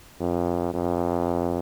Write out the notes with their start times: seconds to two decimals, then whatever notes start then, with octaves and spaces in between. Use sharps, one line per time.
0.20 F2
0.74 F2